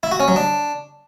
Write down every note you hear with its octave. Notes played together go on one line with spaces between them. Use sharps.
E4
F#4
C#4
F#3
D4